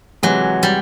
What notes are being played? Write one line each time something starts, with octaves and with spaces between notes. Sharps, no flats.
C3 E3 F#3 G#3
G3